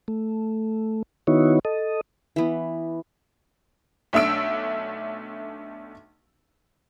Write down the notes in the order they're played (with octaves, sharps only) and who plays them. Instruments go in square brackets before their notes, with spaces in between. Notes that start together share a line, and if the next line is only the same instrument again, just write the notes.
[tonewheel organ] A3
D#3 B3 D#4 E4 F#4 C#5
A4 D#5
[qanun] E3 B3
[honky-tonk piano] B1 A3 D4 E6 D7